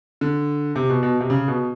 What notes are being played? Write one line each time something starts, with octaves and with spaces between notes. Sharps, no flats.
D3
C3
B2
B2
C3
C#3
B2